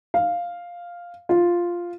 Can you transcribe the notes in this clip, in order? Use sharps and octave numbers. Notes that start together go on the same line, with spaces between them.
F5
F4